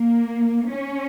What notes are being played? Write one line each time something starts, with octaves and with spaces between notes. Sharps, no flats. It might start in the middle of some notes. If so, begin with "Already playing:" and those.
Already playing: A#3
C#4